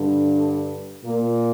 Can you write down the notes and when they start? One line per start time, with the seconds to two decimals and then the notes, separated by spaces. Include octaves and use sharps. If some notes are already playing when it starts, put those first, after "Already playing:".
Already playing: G2 D3
1.06 A#2 A#3